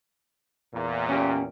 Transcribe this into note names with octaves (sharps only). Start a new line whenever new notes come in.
E2 A#2
C#4 G4